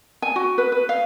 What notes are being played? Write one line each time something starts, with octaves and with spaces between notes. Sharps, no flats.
G#5
F#4
B4
B4
F5